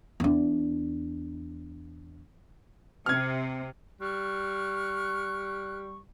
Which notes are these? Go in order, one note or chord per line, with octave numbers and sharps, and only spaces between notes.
E2 D4
C3 F6 G#6
G3 C#6 F6 F#6